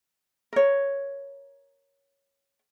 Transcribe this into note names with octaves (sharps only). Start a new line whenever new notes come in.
A#4 C#5